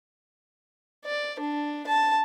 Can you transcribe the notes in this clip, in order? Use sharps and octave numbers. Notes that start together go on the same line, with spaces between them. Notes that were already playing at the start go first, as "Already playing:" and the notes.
D5
D4
A5